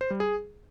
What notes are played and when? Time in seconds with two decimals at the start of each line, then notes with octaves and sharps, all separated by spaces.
0.01 C5
0.10 G3
0.20 G#4